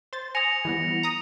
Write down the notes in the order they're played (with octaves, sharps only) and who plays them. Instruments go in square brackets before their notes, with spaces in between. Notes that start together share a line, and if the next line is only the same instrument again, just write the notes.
[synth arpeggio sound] C5 A6
[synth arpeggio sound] G#5 D#6 [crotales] A#6 C#7 F7
[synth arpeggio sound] E3 G3 B3
A#5 D#6